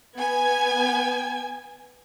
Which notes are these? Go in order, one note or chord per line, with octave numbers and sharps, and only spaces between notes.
B3 G#5 G#6